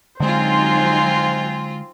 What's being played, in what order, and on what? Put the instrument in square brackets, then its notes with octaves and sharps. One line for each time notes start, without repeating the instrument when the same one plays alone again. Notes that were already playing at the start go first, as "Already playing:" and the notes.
[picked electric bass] D3 G#3 [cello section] F#3 D#4 [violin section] C4 F4 [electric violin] C5 G#5